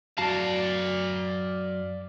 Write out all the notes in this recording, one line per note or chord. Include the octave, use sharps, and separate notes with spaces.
F#2 F#4 D5 F5 A5